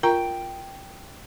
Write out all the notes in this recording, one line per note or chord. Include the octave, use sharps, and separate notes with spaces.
F4 A#4 G5 A#5